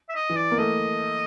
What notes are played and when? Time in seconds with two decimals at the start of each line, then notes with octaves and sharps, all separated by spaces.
0.09 E5
0.15 D#5
0.30 E3
0.36 D5
0.51 A#3
0.58 A3 D#5